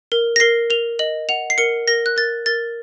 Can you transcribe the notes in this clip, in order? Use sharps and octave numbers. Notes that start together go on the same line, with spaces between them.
A#4
A#6
A#4 C7
A#4 F7
D#5 F#7
F#5 F7
C7
A#4 C#7
A#4 A#6
F#6
A#4 A6
A#4 A6